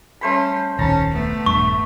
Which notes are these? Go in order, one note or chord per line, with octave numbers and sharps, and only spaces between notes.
G3 A3 C#4 C5 B5
D#1 C2 D#3 C#4 A5 A#5
A3 B3
D#1 G2 C#6